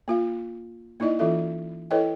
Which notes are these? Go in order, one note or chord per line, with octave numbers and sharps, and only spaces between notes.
A#3 F4 F5
A#3 D#4 E4 D5 D#5
E3 C#4 F4 A4 E5
E4 A4 B4 C#5 D#5 G5